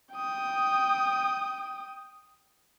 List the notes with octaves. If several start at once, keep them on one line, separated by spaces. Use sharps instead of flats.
G5 D#6